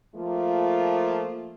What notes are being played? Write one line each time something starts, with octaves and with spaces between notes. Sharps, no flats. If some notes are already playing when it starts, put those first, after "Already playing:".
F3 A3 A#3 F4